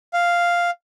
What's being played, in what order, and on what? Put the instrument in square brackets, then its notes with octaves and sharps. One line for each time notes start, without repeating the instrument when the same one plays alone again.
[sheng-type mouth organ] F5